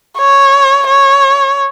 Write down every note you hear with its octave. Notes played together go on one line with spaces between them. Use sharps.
C#5
C#5